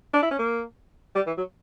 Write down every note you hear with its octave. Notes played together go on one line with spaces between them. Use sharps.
D4
E4
C#4
A#3
G3
E3
F#3